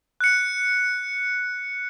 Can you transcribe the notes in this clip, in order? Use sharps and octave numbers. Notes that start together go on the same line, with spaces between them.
F#6 C#7